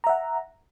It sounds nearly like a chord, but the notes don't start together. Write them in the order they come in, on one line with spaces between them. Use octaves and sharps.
A#5 E5 F#5